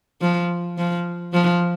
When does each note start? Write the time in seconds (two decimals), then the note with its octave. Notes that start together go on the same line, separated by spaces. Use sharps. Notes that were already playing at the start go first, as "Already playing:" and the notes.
0.22 F3
0.78 F3
1.33 F3